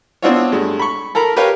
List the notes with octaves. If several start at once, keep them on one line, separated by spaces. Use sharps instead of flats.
B3 C4 D4 E4 F4 C#5
G2 G#3 A3
B5 C#6
A4 A#4 A#5 B5
G4 A#4 B4 C#5 F5